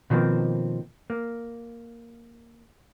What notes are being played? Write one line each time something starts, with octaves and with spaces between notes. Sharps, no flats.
B2 D#3 F3 A#3 C4
A#3